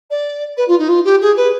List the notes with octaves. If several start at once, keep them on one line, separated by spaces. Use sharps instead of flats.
D5
B4
F4
D#4
F4
G4
G#4
B4